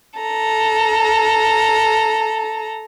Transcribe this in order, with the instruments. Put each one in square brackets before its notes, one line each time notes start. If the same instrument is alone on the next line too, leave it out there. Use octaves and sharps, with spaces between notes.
[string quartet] A4 A#5